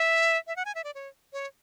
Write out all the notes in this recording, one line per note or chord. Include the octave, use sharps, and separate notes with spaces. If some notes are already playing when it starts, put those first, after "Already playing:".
Already playing: E5
E5
F#5
G#5
E5
D5
C#5
C#5